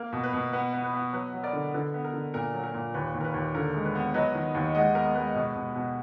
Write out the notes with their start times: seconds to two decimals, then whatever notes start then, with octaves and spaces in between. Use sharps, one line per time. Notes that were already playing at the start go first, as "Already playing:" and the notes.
Already playing: A#3 A#4
0.13 B2
0.24 B4
0.33 B2
0.53 B3 B4
0.73 B3
0.84 B4
0.94 B3
1.13 F#3 B4
1.34 F#3
1.43 A#4 D5
1.53 D3
1.74 D3 B4
1.94 B3
2.04 A#4
2.13 D3
2.34 A#2 A#4
2.54 F#3
2.64 A#4
2.74 A#2
2.94 D#2 B4
3.15 D#2
3.20 A#4
3.25 B4
3.34 D#2
3.55 D3 A#4
3.75 G#3
3.85 B4
3.95 B3
4.14 F#3 B4 D#5
4.35 D#3
4.55 D#2
4.75 G#3 D#5 F#5
4.95 B3 A#4
5.15 G#3 B4
5.35 B2
5.55 B2
5.75 B2